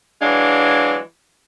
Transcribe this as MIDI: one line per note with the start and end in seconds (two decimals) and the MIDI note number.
0.22 0.98 52
0.22 0.98 54
0.22 0.98 56
0.22 0.98 62
0.22 0.98 77